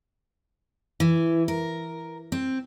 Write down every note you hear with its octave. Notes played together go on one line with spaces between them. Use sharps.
E3
A#4
C4